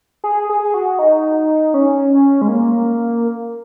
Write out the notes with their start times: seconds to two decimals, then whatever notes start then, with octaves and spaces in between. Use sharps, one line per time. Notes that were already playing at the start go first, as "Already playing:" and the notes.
0.24 G#4
0.49 G#4
0.74 F#4
0.99 D#4
1.74 C#4
2.42 G#3
2.48 A#3